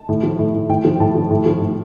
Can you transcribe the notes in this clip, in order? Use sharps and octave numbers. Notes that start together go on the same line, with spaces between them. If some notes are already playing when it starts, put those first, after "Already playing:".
Already playing: A5
A2
F3
A2
A2
A2 G5
F3
A2 A5
F3
A2
F3
A2